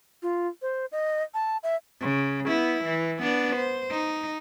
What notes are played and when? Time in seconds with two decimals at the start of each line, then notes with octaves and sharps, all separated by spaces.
0.22 F4
0.62 C5
0.92 D#5
1.34 A5
1.63 E5
2.01 C#3
2.47 B3 E4
2.85 E3
3.22 B3 D4
3.56 C5
3.91 D#4